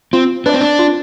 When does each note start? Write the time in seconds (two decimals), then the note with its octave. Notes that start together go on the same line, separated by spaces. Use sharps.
0.13 C4 F4
0.46 D4 B4
0.49 C4 D5
0.61 D4
0.79 F4